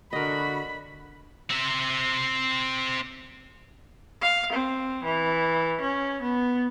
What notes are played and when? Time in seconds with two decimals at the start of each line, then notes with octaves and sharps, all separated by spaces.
0.13 D3 F#4 A#4 D#5 B5
1.50 C4 E5
4.22 F5
4.53 C4
5.04 E3
5.81 C#4
6.23 B3